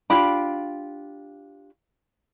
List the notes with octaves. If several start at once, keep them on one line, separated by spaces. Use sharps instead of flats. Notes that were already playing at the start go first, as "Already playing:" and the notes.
D4 F4 G4 B5